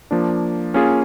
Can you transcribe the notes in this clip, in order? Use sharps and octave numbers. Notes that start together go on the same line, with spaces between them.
F3 A#3 D4
A#3 C#4 F4 G#4